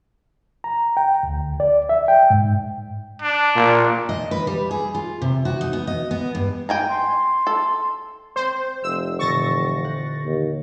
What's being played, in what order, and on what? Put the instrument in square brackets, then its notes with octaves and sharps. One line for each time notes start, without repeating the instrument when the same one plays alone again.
[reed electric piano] A#5
G5
D2
D5
E5
G5
G#2
[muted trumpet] D4
[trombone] A#2
[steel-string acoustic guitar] D#5
B4
G3
G#4
F4
C3
F#4
D#4
B3
D#5
B3
G2
[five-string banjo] G5 G#5 A#5
[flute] C6
[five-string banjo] A4
[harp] C4 [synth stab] C5
[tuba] F1 [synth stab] E6
[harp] A#2 D3 E3 [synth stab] C#6 A6 A#6
[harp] C5 F#5
[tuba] D#2